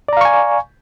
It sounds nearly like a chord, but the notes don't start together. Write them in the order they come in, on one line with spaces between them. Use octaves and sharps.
D5 A#5 F5 C#6 G#5